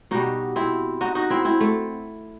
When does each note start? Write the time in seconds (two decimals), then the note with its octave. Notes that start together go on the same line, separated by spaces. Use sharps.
0.11 B2 G3 D#4 F#4
0.56 C4 E4
1.01 D#4 F#4
1.15 D#4 F#4
1.30 C4 E4
1.45 C4 E4
1.60 A3